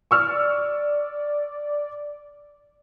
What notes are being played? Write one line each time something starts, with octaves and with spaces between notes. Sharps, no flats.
D5 C#6 E6 F6